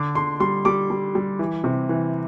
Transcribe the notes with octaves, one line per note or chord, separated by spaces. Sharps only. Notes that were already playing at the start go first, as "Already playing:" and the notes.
Already playing: D3 D6
D3 C6
G3 C6
G3 D6
G3
G3
E3
C3
E3